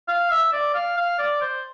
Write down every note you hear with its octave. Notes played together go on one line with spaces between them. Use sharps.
F5
E5
D5
F5
F5
D5
C5